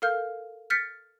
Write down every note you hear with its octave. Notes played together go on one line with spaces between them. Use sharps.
A4 A#4 F5 F6 G6
F6 G6 A6 B6 C#7